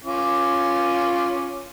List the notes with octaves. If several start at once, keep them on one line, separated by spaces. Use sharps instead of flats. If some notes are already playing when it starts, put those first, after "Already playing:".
C#4 F4 D6